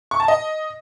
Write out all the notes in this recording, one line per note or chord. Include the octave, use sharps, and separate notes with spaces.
C#6
A5
D#5